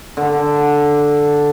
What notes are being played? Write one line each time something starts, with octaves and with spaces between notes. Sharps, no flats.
D3